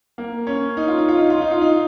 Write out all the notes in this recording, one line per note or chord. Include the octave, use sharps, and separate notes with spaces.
A#3
C#4
D#4
F4
D#4
F4
D#4
F4
D#4
F4
D#4